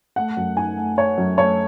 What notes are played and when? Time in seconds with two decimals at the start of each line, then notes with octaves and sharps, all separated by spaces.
0.16 A3 F#5
0.37 F#2
0.57 D#4 G#5
0.77 A3
0.97 A3 C#5
1.18 F#2
1.37 A3 C#5